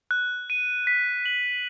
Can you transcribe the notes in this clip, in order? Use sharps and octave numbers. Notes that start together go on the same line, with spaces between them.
F#6
D#7
B6
F#7